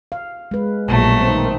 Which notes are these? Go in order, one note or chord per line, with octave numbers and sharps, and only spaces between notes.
F5
G#3 B4
A#1 B2 F#3 A3
D#3 C4